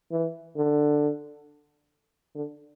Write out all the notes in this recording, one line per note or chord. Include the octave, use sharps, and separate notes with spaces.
E3
D3
D3